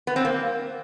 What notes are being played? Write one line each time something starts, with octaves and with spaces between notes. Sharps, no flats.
B3
C4
A#3